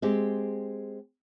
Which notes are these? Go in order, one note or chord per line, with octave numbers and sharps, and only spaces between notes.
G#3 C4 G4